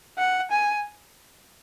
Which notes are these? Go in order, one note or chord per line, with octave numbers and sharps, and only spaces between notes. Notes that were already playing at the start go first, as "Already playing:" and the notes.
F#5
G#5